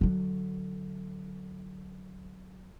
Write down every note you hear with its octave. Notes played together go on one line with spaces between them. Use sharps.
D3 F#3